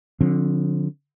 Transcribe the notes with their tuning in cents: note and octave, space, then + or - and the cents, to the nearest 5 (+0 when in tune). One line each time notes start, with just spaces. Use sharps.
D3 +0 F3 +35 C4 +35